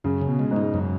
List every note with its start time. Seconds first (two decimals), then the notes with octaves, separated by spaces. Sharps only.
0.04 F#2 C#3
0.21 C#3
0.28 B2
0.39 G#3
0.51 G#2
0.56 D#4
0.74 F#2